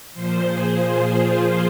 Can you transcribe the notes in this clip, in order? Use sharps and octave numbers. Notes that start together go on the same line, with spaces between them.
A#2 F3 C5
G#4
F4